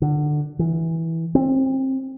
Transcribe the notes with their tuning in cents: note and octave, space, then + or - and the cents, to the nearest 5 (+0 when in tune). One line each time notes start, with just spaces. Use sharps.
D3 +20
E3 -10
C4 +25